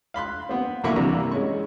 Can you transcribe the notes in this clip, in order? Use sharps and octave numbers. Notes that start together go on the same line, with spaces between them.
F5 B5 C6 F#6
B3 C4
A#1 D3 A#3 E4 B5 C#6
C3 E3 G3 A#5
G#3 C#4 C#6